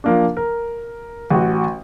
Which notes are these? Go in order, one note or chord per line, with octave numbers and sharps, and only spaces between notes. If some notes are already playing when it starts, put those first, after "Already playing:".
F3 A#3 D4
A#4
A1 F#4